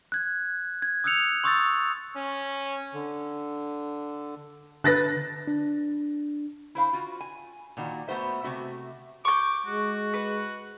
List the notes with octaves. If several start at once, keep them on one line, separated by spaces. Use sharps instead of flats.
F#6 G#6
G#6
D#6 E6 F#6 G6 C#7 F7
C6 C#6 D#6 E6 G6 A6
C#4
D3
D3 B4 A5 F#6 A6 A#6
D4
E4 C5 F5
F4 F#4
G#5
A#2 D#3 F#4
A3 B3 F#4 C5 E5
C3 A3 F#4 E5
C#6 D6 G6
G#3 F#4
B4